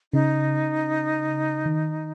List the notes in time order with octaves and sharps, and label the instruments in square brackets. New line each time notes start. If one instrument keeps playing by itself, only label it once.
[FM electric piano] C#3 [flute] D#4
[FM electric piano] D#3